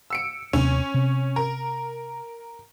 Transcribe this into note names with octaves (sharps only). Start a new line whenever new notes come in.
E6 C#7 D7
D#2 C3 C#4 D4
C3
A#4